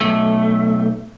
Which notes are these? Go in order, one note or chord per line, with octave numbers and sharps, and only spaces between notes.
B1 A3